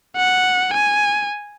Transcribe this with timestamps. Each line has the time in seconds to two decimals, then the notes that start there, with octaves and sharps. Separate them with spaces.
0.17 F#5
0.74 G#5